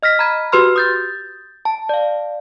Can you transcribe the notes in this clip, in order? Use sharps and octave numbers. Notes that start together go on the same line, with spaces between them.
D#5 F6 A#6 B6
A#5 B5 G#6
F#4 G4 B4 C6 F6
D#6 G6 A6
A5
D5 F5